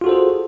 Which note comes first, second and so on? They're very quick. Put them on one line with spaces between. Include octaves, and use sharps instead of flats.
F4 F#4 A4 C5 G#4